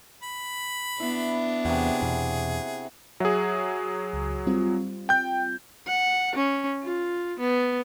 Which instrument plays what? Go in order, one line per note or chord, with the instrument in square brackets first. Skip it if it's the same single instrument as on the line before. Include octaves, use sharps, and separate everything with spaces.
[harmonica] B5
[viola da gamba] B3 D4 [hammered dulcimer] E4
[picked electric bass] E2 [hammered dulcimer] C3 F#4 [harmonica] G#4
[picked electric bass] E2 B2
[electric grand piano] F#3 G#4 [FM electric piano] E5 F#5
[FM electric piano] C#2
G3 C4 F4
[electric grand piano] G5 G6
[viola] F#5
C#4
F4
B3